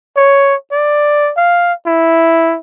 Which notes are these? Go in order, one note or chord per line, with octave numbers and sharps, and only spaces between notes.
C#5
D5
F5
E4